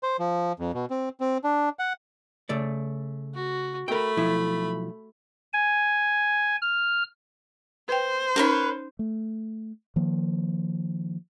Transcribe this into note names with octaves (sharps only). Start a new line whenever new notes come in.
C5
F3
F2
B2
C4
C4
D4
F#5
C#3 A3 D5
F#4
A3 A#4 G5 B5
B1 F3 E4
G#5
F6
B4 C5 G5
C#4 D#4 A#4 B4 C#5
A3
D#3 F3 A#3